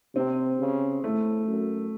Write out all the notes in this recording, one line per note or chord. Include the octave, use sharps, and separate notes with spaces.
C3 C4
C#3
A2 A3
F#2